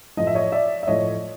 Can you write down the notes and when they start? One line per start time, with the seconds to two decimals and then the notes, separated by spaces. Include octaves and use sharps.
0.17 A2 F3 D#5
0.27 E5
0.35 C#5 D#5
0.52 D5 E5
0.83 E5
0.87 A2 F3 C#5 D#5